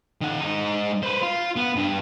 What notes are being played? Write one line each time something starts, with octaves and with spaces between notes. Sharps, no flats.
D#3 F#5
G#2 D#4
B4 C5
F4
B3
G2